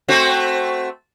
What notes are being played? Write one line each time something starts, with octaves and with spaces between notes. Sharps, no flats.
A3 C4 F#4